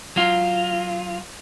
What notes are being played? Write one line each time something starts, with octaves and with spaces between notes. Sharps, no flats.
F#3 F4